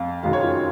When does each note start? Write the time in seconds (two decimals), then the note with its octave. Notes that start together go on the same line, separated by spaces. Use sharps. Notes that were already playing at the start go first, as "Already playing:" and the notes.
Already playing: F2 F5
0.23 F#1 F#2 D#3 F#3 F5
0.33 C#5
0.43 F4